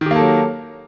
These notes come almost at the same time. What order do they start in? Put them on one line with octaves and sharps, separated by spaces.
D#3 G4 A#3 A4 F#3